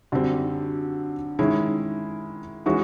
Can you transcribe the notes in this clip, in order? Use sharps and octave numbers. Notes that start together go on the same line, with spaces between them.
F#2 D3 G3 C4
D#3 G#3 C#4 E4
E3 G#3 C#4 F#4